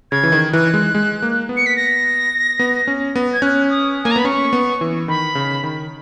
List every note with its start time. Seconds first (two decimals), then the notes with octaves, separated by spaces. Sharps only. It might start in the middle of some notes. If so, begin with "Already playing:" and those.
0.12 C#3 G#6
0.23 E3
0.32 D#3
0.53 E3 F#6
0.74 G#3
0.95 G#3
1.22 A#3
1.49 B3
1.57 C#7
1.66 B6
1.77 A#6
2.59 B3
2.87 C#4
3.16 B3
3.34 G#6
3.42 C#4 F#6
3.70 D#6
4.04 A#3 G#5
4.11 A#5
4.16 B3 B5
4.25 C#4 C#6
4.53 B3
4.81 E3
5.08 D#3 B5
5.35 C#3
5.64 D#3